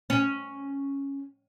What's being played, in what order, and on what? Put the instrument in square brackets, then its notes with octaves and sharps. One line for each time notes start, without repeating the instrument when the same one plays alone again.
[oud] C#4